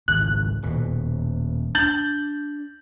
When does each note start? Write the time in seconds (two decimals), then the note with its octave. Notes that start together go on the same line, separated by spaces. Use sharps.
0.08 G#1 C#2 A2 F#6
0.63 D#1 B2
1.75 D4 G6 A6 F#7